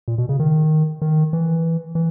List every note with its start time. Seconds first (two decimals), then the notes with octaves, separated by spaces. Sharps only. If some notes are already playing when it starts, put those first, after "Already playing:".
0.08 A#2
0.18 B2
0.29 C#3
0.39 D#3
1.02 D#3
1.33 E3
1.95 E3